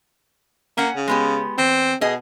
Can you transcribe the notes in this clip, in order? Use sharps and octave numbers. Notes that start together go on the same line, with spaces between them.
A#3 C#4 F#5
C#3
G#3 B3 G4
E2 C4
B2 G#4 D#5